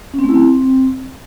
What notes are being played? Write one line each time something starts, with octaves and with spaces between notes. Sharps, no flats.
C#4
C4
A3
E4
C4